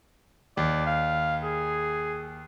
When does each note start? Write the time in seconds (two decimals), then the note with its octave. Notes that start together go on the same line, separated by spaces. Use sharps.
0.57 D#2 D5
0.87 F5
1.44 G#4